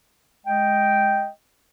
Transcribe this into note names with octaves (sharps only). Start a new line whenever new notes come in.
G#3 D#5 G5